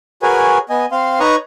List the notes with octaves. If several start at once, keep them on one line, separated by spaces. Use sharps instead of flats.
F#4 G#4 A#4 B4 C#5 G#5
B3 D#5 G#5
C4 F5 C6
D#4 B4 C#5 A#5 C#6 D#6